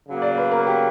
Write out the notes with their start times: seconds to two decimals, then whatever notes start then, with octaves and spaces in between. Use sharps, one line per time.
0.08 C#3 F#3 A#3
0.22 D5
0.38 B4
0.51 A#4
0.67 G4